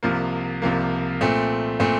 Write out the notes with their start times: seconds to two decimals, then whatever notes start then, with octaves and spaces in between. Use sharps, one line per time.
0.03 C2 C3 F3 A#3
0.62 C2 C3 F3 A#3
1.21 A#2 A3 C4
1.80 A#2 A3 C4